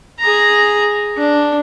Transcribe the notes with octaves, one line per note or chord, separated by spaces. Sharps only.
G#4 A#5
D4